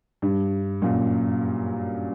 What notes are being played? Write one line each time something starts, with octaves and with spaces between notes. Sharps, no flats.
G2
F#2 A#2